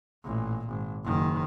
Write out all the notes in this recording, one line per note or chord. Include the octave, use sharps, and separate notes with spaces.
A1 A#2
G#1
F#1 D#3